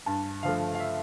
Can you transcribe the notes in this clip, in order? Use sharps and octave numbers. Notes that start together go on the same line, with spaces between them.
G2 A5
D3 F3 A3 F5
F5
E5